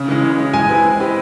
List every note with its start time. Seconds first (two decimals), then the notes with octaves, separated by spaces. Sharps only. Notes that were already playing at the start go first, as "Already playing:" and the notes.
Already playing: C#3
0.08 E3 G#3
0.23 C#3
0.38 E3 G#3
0.53 G#3 G#5
0.69 C4 E4 G4 B4
0.84 G#3
1.00 C4 E4 G4 B4